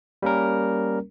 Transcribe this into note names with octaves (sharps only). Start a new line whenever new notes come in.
G3 A#3 C#4 A#4